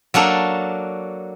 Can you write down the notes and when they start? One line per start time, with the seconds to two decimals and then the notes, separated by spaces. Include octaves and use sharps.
0.14 F#3 A#3 D4 A4